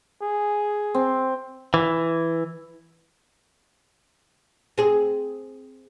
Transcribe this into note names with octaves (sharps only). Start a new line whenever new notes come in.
G#4
C4
E3
C4 G#4